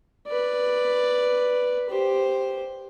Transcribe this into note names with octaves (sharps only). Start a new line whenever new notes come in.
B4 D5
G4 C5